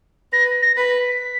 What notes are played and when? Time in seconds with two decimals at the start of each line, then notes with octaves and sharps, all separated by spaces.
0.32 B4 A#6
0.62 A#6
0.77 B4 B6
0.99 B6